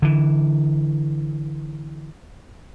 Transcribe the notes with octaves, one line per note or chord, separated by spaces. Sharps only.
D3 E3